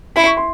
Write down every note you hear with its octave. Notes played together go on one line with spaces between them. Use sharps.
E4 B5
C#6
C6